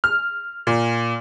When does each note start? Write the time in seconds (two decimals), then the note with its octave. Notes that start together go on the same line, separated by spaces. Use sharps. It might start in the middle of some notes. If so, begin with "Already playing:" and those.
0.04 F6
0.67 A#2